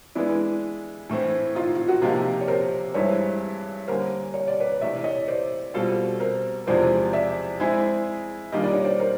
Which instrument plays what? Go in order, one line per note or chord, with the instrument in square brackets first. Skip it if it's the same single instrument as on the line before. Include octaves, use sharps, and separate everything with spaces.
[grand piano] E3 G#3 B3 [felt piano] D4 E4
[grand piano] A2 E3 A3 C4
[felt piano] D#4 F4
F4
F#4
[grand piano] C3 F3 A#3 D#4 [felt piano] F4 G4
[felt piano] C#5
A#4 C5
[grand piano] G2 E3 G#3 C4 E4 [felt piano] B4 C#5
[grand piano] D3 G3 A#3 C#4 [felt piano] A#4 C5
[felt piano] C#5
D5
B4 C#5
[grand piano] C3 E3 A3 [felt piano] D5 E5
[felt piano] C#5 D#5
C5 D5
[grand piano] B2 G3 C4 F4 A4
[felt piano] A#4 C5
[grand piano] E2 C3 F3 G#3 C4 [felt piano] C5 D5
[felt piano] D5 E5
[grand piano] G#3 C4 E4 G#4
[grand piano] D#3 G3 A#3 D4 F4 [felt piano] D#5
[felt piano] D5
C#5
C5 D5
A#4 C5